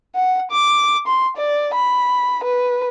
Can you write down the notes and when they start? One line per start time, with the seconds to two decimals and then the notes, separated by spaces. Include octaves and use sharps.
0.15 F#5
0.51 D6
1.07 C6
1.37 D5
1.74 B5
2.44 B4